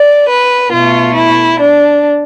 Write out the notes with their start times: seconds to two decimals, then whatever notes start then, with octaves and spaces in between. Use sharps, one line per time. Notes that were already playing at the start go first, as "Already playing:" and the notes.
Already playing: D5
0.29 B4
0.73 B2 A3 F4
1.16 E4
1.61 D4